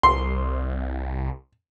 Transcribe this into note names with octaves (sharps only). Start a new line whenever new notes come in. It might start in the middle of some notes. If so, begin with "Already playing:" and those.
C2 C6